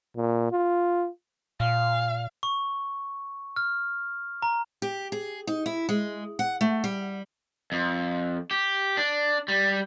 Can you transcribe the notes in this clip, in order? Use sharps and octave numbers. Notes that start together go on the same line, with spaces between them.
A#2
F4
A#2 F5
C#6
F6
A#5
G4
G#4
D#4
E4
G#3
F#5
A3
G3
F2
G4
D4
G3